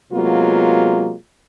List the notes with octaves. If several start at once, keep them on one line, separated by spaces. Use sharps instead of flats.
C3 F#3 G#3 A#3 B3 F4